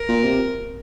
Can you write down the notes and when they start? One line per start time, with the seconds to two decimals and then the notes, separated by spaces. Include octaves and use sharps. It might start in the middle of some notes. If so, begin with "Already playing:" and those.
Already playing: A#4
0.08 A#2
0.24 C3